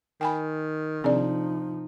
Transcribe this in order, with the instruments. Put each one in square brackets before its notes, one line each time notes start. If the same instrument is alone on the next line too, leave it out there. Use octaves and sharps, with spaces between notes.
[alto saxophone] D#3 [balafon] G5 G#5 B5
[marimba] C3 D5 [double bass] F3 D#4 [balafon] C4 D4 G#4